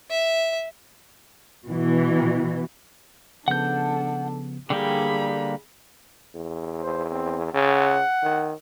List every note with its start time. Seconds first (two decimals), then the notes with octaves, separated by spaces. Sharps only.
0.10 E5
1.64 B2 E3
3.48 C#3 F3 B3 D4 A4 F#5 G6
4.70 D3 G3 A#3 G#4 G5 B5
6.35 E2
6.82 C5
7.11 C4
7.54 C#3 F#5
8.23 D#3